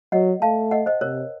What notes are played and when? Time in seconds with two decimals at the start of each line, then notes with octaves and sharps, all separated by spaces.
0.12 F#3 D#5 F#5
0.42 A3 F5 A5
0.71 D#5 F#5
0.86 C5 D#5
1.01 C3 A#4 C#5